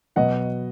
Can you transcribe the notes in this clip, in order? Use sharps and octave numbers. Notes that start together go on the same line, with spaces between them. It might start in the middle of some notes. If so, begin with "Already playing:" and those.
B2 F#3 B3 D#5 F#5